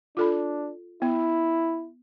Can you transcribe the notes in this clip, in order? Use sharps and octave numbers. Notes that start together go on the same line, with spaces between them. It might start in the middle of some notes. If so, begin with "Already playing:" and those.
D4 F4 A4 B5
B3 E4